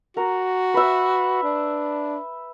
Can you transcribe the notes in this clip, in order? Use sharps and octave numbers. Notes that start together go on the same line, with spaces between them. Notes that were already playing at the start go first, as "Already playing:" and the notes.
F#4 A#4
B4 E5
D4